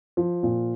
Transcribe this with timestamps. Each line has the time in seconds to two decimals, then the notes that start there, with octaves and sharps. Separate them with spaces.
0.17 F3
0.43 A#2